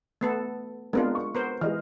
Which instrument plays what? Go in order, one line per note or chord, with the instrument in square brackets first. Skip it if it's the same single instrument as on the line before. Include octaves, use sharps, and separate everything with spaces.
[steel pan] A3 B3 A4
[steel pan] G#3 D4 F4 [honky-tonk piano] B3 C4 A#4
[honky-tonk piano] C#6
[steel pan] B3 A#4 C5
[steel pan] E3 [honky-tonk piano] G#3 D#5 F6